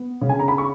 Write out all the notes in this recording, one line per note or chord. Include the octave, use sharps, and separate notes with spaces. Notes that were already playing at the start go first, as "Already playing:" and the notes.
Already playing: B3
C#3
G#5
A#5
B5
C#6